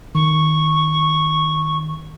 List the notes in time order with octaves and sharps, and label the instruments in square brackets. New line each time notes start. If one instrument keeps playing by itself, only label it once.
[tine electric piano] D#3 [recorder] C#6